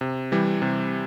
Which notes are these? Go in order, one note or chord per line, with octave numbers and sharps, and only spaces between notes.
C3
E3 G3
C3